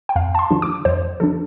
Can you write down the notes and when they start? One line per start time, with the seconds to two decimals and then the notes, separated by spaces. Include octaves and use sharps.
0.09 G5
0.16 F2 F5
0.35 A5
0.39 C6
0.51 D3 F3 D4
0.62 D6
0.85 F2 C5
1.20 D3 F3 D4 A4